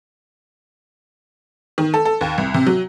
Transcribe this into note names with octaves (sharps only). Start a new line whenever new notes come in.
D#3
A4
A4
D#2
C2
C3
F#3